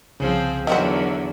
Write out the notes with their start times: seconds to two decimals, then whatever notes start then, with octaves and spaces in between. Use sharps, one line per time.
0.20 C2 C#3 F3 C4 G#4
0.67 E2 D3 D#3 F#3 A#4 C5 E5 F#5